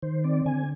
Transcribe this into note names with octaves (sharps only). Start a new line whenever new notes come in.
D#3 C5
C4 D5
D3 G#5